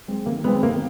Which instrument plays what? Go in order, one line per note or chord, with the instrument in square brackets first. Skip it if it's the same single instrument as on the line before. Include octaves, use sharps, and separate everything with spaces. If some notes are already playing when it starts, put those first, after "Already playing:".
[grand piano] G#3 C4
[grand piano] D#3 [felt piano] A#3
[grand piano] G#3 C4 [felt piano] B3
[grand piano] D#3 [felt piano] A#3